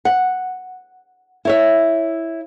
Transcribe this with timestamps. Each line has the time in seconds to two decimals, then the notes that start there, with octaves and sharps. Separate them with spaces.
0.05 F#5
1.45 E4 C#5 E5